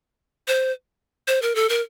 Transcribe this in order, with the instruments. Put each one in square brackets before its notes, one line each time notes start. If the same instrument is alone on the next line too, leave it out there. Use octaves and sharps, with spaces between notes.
[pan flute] C5
C5
A#4
A4
A#4